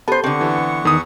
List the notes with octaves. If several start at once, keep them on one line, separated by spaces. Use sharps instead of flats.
B3 G4 A4 C5 A5
D3 B3 C4 F#5 C#6
E3
E2 D#3 D#6